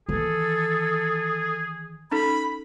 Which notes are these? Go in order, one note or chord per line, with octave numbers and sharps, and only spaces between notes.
D#3 E3 G#4 A4
C#4 D#4 A4 B5